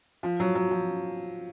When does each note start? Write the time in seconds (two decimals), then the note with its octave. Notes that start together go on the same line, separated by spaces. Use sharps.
0.23 F3
0.40 F#3
0.55 F#3
0.71 F3